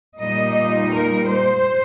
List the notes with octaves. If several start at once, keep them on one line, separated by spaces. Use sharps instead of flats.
A#2 G3 A#3 D#4 D#5
A#4
C5